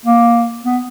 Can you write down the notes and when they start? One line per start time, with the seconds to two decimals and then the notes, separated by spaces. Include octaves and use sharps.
0.05 A#3
0.64 B3